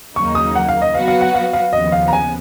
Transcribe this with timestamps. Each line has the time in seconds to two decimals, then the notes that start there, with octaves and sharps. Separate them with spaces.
0.15 D#2 C#3 F#3 A#3 D#4 C#6
0.35 D#6
0.55 F#5
0.69 F5
0.82 D#5
0.94 F#3 B3 F#4 B4 F5
1.08 F5
1.21 F#5
1.34 F5
1.53 F5
1.73 D#2 C#3 F3 B3 D#5
1.92 F5
2.08 A#5
2.13 G#5